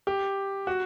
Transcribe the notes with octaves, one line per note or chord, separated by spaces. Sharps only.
G4
F#4